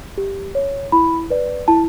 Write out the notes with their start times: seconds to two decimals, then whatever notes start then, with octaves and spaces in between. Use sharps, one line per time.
0.18 G4
0.55 C#5
0.92 E4 B5
1.30 B4 D5
1.68 E4 A5